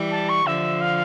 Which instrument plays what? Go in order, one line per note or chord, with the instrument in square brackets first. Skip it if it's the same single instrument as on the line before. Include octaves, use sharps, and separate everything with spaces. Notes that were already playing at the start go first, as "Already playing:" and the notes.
Already playing: [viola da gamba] E3 G3
[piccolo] A5
C#6
[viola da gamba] D3 F3 [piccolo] E5
[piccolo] F5